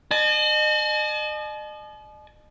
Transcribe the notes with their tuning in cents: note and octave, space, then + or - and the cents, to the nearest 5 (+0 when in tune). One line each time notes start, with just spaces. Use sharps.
D#5 -40 A5 -45